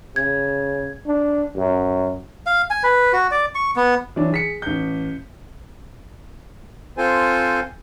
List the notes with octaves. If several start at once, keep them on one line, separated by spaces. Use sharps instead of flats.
C#3 G#6
D4
F#2
F5
G#5
B4
F#4
D5
C#6
B3
E3 F#3 D4
G#4 B6 C#7
A1 G6
C4 F4 A4 C5 G#5